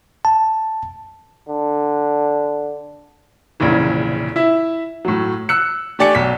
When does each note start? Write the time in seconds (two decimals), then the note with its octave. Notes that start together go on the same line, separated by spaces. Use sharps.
0.25 A5
1.48 D3
3.60 F1 A#1 A#2 C#3 E3
4.36 E4 E5
5.05 A2 F#3
5.49 E6 F#6 C#7
5.99 A3 G4 D5 G#5 C#7
6.15 B1 B6